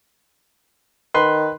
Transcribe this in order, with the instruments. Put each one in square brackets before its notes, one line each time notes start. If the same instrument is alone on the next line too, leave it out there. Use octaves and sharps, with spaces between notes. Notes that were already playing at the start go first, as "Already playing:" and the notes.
[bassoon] D#3 [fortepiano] B4 C6